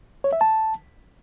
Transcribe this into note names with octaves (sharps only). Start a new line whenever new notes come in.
C#5
E5
A5